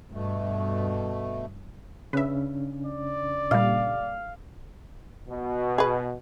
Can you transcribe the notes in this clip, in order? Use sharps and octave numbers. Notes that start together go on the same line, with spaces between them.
G2 B2 A3
C#3 C#4 D4 B4 E5
D5
A#2 G3 F5
B2
G#4 B4